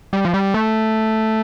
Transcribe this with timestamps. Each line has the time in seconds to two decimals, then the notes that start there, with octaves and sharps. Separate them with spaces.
0.13 G3
0.25 F3
0.34 G3
0.54 A3